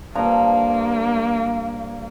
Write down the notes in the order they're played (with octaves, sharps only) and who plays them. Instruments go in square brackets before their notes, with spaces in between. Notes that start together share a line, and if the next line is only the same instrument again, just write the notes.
[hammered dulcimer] G2 F3 A#5 [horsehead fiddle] A#3